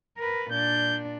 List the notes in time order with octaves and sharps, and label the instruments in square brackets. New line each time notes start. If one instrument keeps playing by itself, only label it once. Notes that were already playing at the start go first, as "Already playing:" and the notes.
[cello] A#4 B4
[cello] A#2 D4 [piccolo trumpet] G6